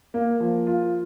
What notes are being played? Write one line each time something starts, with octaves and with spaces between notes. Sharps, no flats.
A#3
F3
F4